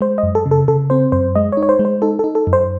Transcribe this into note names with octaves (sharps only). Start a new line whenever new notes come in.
G#3 C5
D#5
F#2
A4
C#3
A4
C#3 A4
C4 C5
F#2 C5
G#3 D#5
C#5
D#4
C#5
C5
G#3
C5
D#4 A4
D#4 A4
A4
F#2
C5